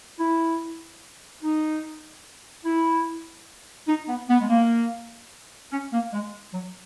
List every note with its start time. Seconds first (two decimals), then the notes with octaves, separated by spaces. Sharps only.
0.19 E4
1.43 D#4
2.65 E4
3.88 D#4
4.08 B3
4.29 B3
4.41 G#3
4.49 A#3
5.72 C#4
5.92 A#3
6.13 G#3
6.54 F#3